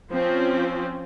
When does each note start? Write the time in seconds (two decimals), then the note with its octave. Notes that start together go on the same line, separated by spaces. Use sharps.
0.13 F3 C4 C#4